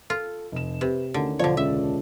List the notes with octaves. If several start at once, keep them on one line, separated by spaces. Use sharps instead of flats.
F4 A4
F1 E7
C3 B4
D2 D3 D#3 C#4
E1 D3 F3 C#5 D5 A5
C#2 E5